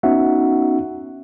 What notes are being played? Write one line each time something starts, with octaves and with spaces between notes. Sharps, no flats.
B3 C#4 D#4 F#4 E5 F#5